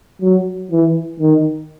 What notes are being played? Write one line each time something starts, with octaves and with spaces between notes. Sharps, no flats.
F#3
E3
D#3